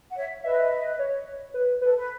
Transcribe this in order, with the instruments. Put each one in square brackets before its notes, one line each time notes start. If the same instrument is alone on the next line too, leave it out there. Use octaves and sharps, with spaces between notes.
[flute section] F#5
C#5 E5
[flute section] B4 D#5 [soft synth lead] E5
[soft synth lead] C#5
B4
[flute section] A4 [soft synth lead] B4
[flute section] B4